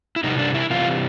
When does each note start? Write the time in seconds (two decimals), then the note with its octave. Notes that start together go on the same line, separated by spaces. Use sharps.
0.16 E4
0.24 C3 E3 G3 D#4
0.39 D4
0.54 E4
0.70 C3 E3 G3 F4